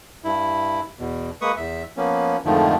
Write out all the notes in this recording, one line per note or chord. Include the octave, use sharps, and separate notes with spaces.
G2 E4
E2 B2
G#3 A#3 B4 C#6 D#6
E2 E5
F3 A#3 B3 C#4
F2 G#2 D3 D#3 F3 A3